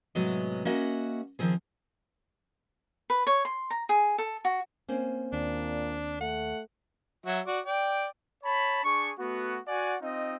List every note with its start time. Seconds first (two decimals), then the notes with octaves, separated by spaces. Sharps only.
0.15 A2 C3 F#3 G#3 B3 D#5
0.65 A#3 C#4 F#4 D#5 E5 F#5
1.39 D#3 F3 C4 G#4
3.10 B4
3.27 C#5
3.45 C6
3.70 A#5
3.89 G#4
4.18 A4
4.45 F#4
4.88 A#3 C4 C#4
5.32 D#2 A#2 D4
6.21 A3 F#5
7.26 F#3 F#4 E5
7.47 F#4 D5
7.66 D5 G5
8.44 C#5 A5 B5
8.83 D4 G#4 C#6
9.18 A3 B3 F#4
9.66 F#4 D5 F#5 G#5
10.02 C4 D#4 F4 D#5